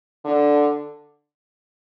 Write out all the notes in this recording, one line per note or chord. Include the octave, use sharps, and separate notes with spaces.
D3